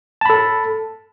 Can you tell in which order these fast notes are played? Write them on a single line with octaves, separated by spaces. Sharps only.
A5 B5 A4